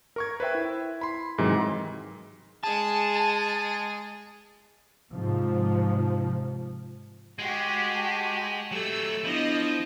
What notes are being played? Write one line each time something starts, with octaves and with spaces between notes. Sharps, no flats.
A#4 C#6 G#6
B4 C5 E5 G5
E4
B5 C6
G#2 C3 D#3 E3 F#3 G#3
G#3 G#4 A5
G#2 C3 F3
G#3 F#4 G4
A5
F#3 A3 G4 A4 E6
F3 B3 D4 E4 D#5